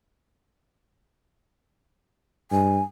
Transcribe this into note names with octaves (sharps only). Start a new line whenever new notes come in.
G2 G#5